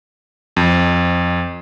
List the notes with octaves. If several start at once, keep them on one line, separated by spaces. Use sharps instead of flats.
F2